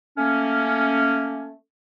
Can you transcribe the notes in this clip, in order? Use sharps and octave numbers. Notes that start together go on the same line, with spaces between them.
A3 A#3 C#4